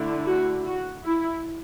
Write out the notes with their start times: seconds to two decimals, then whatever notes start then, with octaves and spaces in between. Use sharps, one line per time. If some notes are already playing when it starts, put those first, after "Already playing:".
Already playing: D3 A3 E4
0.26 F#4
0.65 F#4
1.03 E4